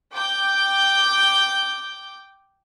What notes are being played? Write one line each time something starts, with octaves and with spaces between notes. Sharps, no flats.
G5 D6 G6